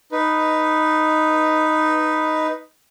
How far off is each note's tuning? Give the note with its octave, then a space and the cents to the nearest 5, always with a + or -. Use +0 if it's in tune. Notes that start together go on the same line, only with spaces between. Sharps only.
D#4 +0 B4 +0